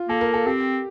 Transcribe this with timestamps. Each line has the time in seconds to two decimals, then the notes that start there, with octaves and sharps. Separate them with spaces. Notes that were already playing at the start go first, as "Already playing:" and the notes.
Already playing: F4
0.09 A#3 A4
0.21 A#4
0.34 A4
0.46 C4 G4